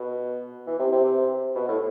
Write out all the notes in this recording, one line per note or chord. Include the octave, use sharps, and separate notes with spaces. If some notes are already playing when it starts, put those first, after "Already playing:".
Already playing: B2
E3
C3
C3
B2
A2